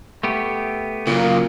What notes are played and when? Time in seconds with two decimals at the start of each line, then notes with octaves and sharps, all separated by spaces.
0.23 A3 B3 G4
1.07 A#2 C#3 F#3 A#3